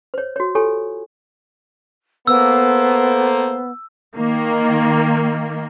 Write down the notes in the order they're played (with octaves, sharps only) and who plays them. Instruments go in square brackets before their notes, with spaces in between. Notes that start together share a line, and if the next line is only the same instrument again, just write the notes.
[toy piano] C5 C#5
F#4 C#5
F4 G4 A4 C#5 G#5
[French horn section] A#3 A4 C5 [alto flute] B3 [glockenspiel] E6
[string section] D#3 A#3